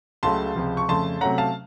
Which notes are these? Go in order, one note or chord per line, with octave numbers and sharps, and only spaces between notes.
C#2 C#3 F#3 A3 A5 C6
C#2 C3 F3
C#6
F2 C#3 A3 A5 C6
C3 F#3 A3 C#4 F#5 A#5
F5 A5